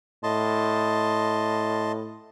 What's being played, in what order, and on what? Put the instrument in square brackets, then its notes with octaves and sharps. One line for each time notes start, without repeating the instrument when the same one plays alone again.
[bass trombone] A2 [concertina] D#5 A5 C6